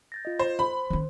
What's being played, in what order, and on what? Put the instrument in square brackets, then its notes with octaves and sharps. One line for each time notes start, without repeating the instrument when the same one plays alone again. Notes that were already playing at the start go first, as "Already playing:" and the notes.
[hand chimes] G6 A6 A#6
F4 D#5
[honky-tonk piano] C5
[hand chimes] C5 C6 [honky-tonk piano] B5
[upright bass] D#3 C#4